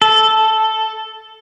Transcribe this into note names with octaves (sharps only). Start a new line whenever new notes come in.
A4